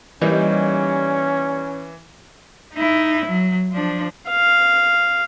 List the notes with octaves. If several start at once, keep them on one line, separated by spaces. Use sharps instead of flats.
E3 G3 A#3 C#4 D#4
D#4 E4
F#3
F3 D4
F5